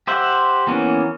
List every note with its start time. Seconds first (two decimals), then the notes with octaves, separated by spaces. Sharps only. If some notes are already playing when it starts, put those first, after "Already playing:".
0.07 G4 C5 E5 F#5
0.67 E3 A#3 B3 C#4